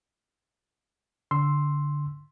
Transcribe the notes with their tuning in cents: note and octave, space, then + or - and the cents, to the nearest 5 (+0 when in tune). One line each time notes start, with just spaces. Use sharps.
D3 -15 C6 +0 E6 +0